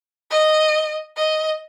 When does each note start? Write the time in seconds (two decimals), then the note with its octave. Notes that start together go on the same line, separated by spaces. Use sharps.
0.31 D#5
1.16 D#5